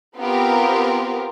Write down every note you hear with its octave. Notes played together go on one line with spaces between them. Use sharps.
B3 C4 F4 G4 A#4